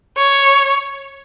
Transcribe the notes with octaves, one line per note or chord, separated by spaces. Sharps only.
C#5